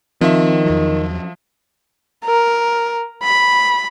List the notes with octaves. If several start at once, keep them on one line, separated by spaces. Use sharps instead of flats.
D#3 F3 C4 E5
E2 F#3
A#4
B5